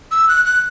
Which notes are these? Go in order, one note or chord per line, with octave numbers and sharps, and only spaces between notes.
E6
F#6
F#6